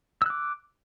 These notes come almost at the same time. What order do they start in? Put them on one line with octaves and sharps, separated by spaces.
E6 F#6 D6